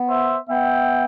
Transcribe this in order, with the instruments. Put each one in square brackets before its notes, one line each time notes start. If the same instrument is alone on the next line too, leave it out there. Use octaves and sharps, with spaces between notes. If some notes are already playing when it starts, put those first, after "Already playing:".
Already playing: [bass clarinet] B3
[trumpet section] C5 E5
[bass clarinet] B3 [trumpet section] E5 G5